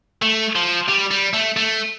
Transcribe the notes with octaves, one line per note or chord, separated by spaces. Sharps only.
A3
F3
G3
G3
A3
A3